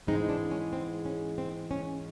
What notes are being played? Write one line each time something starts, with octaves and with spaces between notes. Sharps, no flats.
G#2 E3 G#3 C4 D#4
D4
C#4
C4
C#4
C4
C#4